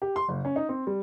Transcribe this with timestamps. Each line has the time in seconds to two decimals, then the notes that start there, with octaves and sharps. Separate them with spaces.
0.02 G4
0.16 C6
0.28 F#1
0.45 C#4
0.56 D#4
0.69 C4
0.87 G3